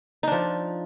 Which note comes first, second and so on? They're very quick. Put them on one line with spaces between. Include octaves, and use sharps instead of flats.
D#4 D4 F3